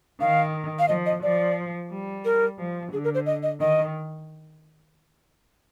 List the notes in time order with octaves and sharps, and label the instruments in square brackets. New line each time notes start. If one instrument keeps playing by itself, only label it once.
[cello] D#3 [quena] F5
[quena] F5
[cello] F3 [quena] D#5
[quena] D#5
[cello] F3 [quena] D5
[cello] G3
[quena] A#4
[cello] F3
[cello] D3 [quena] G#4
[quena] A#4
C5
D#5
D#5
[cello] D#3 [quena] D#5